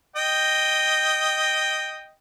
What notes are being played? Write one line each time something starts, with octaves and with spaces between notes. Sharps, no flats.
D#5 G5